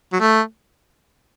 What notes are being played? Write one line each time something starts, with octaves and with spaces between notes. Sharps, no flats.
F#3
A3